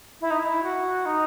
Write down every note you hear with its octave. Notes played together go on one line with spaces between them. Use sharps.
E4
D#4
E4
F#4
D#4